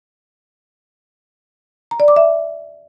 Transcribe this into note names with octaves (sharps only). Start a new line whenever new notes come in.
A#5
D5
D6
E5